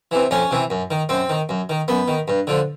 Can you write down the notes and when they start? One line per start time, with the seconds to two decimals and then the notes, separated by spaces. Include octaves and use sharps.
0.11 C3 E3
0.31 F2 C#4
0.51 C3 E3
0.70 F#2
0.91 D#3
1.09 F#2 C4
1.30 D#3
1.49 F#2
1.70 D#3
1.88 F#2 B3
2.08 D#3
2.28 G2
2.47 D3 F3